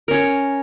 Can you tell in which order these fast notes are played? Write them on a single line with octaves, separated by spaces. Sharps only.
A#4 C#4 C#5